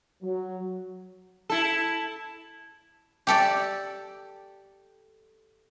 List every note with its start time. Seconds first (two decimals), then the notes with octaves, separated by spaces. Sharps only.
0.22 F#3
1.50 E4 A4
3.27 G4 A4 D5